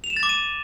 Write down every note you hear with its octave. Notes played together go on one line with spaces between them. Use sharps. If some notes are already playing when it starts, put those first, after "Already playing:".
F7
E7
A6
D6
D#7